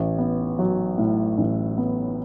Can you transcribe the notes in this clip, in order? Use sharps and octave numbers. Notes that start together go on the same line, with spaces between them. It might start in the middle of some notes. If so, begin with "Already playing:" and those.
Already playing: A1
B3
F#3
A2
A1
B3